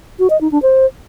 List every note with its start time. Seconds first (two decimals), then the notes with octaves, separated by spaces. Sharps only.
0.19 F#4
0.30 D#5
0.41 D#4
0.51 D4
0.62 C5